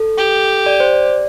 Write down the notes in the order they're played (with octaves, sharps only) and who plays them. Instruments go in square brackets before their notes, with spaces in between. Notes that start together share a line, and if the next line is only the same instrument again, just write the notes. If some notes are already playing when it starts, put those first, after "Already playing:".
Already playing: [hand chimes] A4
[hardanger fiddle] G4
[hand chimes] D5
C5
D5